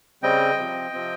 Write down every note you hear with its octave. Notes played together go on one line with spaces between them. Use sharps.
C#3 G3 C4 D#5 G5
C3 F3 C4
C3 F3 C4